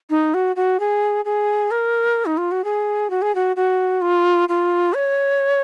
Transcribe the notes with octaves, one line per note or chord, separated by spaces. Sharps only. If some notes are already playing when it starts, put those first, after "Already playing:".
D#4
F#4
F#4
G#4
G#4
A#4
D#4
F4
F#4
G#4
F#4
G#4
F#4
F#4
F4
F4
C#5